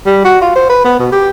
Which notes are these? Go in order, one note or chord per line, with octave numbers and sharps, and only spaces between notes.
G3
F#4
F4
C5
B4
B3
B2
G4